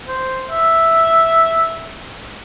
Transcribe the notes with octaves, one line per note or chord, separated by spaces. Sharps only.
C5
E5